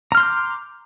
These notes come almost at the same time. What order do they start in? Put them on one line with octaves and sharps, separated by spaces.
A#5 F6 C6 G6 D6